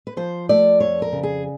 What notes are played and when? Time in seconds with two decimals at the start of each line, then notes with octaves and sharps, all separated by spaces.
0.07 B4
0.17 F3 C5
0.49 A3 D5
0.80 F2 C#5
1.02 A#4
1.12 C#3
1.23 G#4